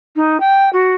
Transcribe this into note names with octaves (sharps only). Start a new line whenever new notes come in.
D#4
G5
F#4